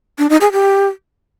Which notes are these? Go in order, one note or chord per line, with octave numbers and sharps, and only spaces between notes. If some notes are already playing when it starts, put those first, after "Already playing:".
D4
D#4
G#4
G4